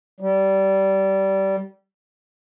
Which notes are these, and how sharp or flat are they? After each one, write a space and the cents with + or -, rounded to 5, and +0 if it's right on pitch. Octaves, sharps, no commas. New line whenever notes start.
G3 -20